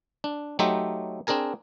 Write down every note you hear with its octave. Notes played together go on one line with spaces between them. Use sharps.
D4
F#3 A3 D#4 G4 C5 E5
C4 D4 G#4 A#4 G#5